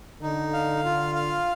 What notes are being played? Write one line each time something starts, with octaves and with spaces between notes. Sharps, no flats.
D3 D#4
F5
F4
F5